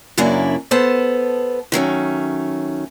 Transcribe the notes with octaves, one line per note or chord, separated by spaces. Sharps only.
F#2 C#3 F#3 A#3 D4 E4
B3 A4 C5 A5
D#3 F#3 A3 C#4